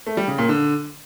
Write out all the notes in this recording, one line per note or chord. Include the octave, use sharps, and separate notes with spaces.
A3
G3
C#3
A#2
D3